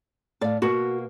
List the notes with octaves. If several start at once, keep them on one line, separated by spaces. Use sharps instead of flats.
A2 D5 F5
B2 A#3 B3 F#4